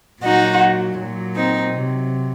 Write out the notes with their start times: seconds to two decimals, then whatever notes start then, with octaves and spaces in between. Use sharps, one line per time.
0.22 A#2 F#3 D#4 F#4
0.98 A#2 F#3
1.35 C4 D#4
1.73 C3 F#3